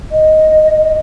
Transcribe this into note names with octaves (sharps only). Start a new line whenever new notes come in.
D#5